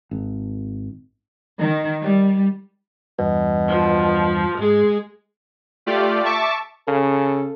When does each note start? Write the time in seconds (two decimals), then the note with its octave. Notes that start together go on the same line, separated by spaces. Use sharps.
0.11 G#1
1.59 D#3
2.02 G3
3.19 E2 G2 B2
3.68 F3
4.58 G#2 G#3 G#4
5.86 A3 F4 G4 D5
6.25 E5 A5 C#6 D6
6.88 C#3 A4